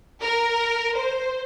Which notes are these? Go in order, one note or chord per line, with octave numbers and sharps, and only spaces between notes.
A#4
C5